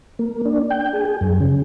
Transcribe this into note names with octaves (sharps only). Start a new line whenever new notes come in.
A#3
D4
G5
G#4
G#4
F#2
C#3